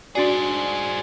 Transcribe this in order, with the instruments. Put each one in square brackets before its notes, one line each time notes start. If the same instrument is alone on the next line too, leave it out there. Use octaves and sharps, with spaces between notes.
[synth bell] D4 F#4 D5 [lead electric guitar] G#4 C5